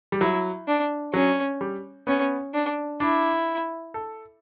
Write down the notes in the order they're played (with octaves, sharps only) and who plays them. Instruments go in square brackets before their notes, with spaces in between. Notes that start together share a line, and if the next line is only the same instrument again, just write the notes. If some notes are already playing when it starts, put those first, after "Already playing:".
[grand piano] G3
[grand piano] F#3 [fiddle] E4
[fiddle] D4
[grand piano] F#3 [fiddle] C#4
[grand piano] G3
[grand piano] B3 [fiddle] C#4
[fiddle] D4
[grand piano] D4 [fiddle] E4
[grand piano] A4